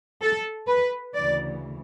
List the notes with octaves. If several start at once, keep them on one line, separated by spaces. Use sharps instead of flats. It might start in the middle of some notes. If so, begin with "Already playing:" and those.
A4
B4
D2 C#3 E3 D5